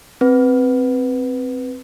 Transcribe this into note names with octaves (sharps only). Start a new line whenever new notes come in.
C4 B4